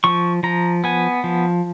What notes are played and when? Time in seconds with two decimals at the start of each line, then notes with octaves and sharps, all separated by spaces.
0.04 F3 C#6
0.43 F3 A#5
0.84 B3 G#5
1.24 F3